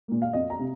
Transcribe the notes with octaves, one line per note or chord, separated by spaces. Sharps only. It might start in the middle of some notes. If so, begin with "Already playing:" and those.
A#2 A#3
F5
F2 D#5
A#5
C3